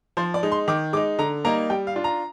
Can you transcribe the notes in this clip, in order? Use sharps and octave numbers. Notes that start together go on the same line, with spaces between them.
F3 C5
D5
G#3 D#4
C6
D#3 D6
G#3 D#4 D6
D3 A#5
G3 A#3 D#4 A#5
G3 G5
F5
D4 F4
A#5